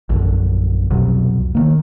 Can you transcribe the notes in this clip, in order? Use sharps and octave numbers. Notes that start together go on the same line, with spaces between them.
A#1 F#2 D3
C2 F2 B2 F#3
D#3 A#3